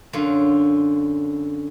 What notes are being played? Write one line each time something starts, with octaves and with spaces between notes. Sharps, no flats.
F#2 D3 F4